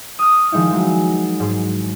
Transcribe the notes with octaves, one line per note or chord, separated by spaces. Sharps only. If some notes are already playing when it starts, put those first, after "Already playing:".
D#6 F6
D#3 F3 G#3 D#4 E4
F#3 G#3
G#2 C6